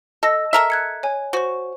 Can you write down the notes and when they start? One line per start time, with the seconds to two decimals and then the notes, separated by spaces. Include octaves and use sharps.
0.23 A4 D#5 E6 A#6
0.53 A4 A#4 E5
0.70 F#6 G#6 C#7
1.03 C#5 G#5
1.33 F#4 C5 C#6